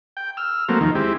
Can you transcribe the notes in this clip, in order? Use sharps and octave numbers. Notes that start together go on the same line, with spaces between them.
G5
E6 F6
F#3 A3 A#3 C4
D#2 D#3 F3
G#3 C4 E4 G4